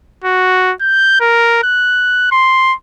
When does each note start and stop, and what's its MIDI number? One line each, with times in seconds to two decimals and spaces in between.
0.24 0.73 66
0.81 1.19 91
1.20 1.63 70
1.64 2.32 90
2.32 2.74 84